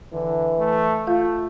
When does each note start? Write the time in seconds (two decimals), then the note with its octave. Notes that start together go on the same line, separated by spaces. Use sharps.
0.12 D3 E3
0.59 A3
1.07 A3 F4 F5 G6